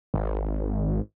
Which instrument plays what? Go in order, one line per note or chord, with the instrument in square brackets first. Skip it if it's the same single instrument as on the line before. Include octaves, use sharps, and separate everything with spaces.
[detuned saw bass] G#1